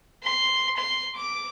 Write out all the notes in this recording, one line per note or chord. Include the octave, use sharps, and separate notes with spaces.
C6
C6
D6